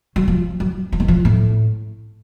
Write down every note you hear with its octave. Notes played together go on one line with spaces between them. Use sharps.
F#3
F3
F#3
F3
D#3
F3
A2